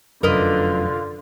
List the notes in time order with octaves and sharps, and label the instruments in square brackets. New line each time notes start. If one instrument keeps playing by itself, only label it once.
[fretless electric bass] F1 F#2 [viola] D3 [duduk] F4 [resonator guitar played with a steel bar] A#4 B4 D#5